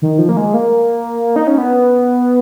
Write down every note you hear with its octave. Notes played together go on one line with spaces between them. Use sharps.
D#3
F3
A#3
G#3
A#3
D#4
C#4
B3